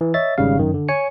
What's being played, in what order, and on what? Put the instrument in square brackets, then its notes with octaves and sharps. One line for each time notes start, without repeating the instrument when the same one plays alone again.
[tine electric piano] E3
C#5 D#5 E5 A6
G#1 G#2 C#3 G3 F5
F#2 D#3
D3
C#5 G#5 C#7